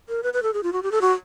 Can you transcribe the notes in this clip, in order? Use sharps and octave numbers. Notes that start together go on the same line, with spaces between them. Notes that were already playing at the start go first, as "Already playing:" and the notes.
A#4
B4
B4
A4
G#4
F4
F#4
G4
A4
F#4